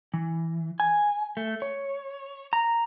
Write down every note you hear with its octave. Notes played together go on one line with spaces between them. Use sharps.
E3
G#5
A3
C#5
A#5